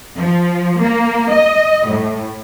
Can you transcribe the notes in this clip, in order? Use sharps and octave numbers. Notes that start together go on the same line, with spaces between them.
F3
A#3
D#5
A2